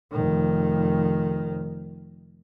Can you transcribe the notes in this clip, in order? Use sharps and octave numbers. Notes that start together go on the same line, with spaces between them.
F1 D#3